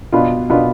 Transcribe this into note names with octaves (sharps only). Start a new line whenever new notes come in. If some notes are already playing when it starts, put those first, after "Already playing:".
B2 B3 D4 F4
B2 B3 D4 F4